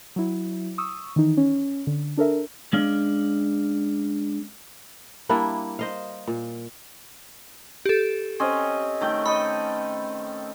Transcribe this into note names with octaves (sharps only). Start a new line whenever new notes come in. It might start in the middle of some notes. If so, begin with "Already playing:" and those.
F#3 E4
C#6 D#6 E6
D#3 E3 D#4
C#4
D3
D4 A4 A#4 E5
G#3 C#4 D4 F5
G3 A#3 D4 E4
C5 D#5 F5
A#2
G4 A4
C4 C#4 D#5
D#3 A3 G5
A4 D#5 B5